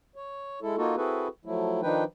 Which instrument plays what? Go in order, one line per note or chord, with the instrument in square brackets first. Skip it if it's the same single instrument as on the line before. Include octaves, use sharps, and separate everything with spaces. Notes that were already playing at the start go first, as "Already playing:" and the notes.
[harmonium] C#5
G#3 E4 A4
A#3 D#4 F4 F#4 A4
C4 E4 F#4 G#4 A4 B4
F3 F#3 A3 E4
D#3 F3 D4 D#4 B4 G5